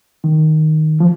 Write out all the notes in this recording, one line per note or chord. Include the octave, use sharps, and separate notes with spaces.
D#3
F3